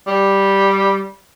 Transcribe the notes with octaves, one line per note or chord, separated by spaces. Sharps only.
G3